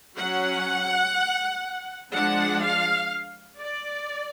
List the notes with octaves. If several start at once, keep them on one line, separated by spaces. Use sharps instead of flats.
F#3 C#4 F#5
F3 G#3 D4 F#5
F5
D5